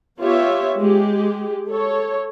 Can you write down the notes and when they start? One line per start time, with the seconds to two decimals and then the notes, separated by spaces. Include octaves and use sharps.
0.20 B3 F4 G4 C#5 E5
0.78 G#3 G4
1.68 A4 C#5